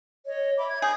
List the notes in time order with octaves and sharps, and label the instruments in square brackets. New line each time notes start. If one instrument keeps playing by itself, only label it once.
[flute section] C#5 D#5
E5 B5 D6
G#6
[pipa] G#4 [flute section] D#6 G6